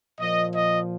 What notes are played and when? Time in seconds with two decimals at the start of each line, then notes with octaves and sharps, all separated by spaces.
0.19 A#2 F3 D#5
0.55 D#5